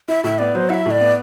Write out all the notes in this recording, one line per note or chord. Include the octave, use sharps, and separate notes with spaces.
E4 E5
A2 E5
B3 D5
F#3 C5
E4 E5 F#5
A2
D5
B3